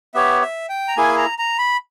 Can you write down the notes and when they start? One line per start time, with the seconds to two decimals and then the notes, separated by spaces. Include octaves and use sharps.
0.14 B3 G4 C#5 E5
0.42 E5
0.69 G5
0.88 A#5
0.97 A#3 E4 G#4 G#5
1.18 A#5
1.38 A#5
1.58 B5